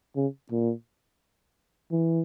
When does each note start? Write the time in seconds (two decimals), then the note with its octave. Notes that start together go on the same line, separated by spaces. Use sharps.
0.16 C#3
0.51 A#2
1.91 E3